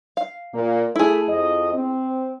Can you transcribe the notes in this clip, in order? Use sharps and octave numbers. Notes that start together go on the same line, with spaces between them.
F5
A#2 A#3
A3 E4 G#4
F2 D#5
C4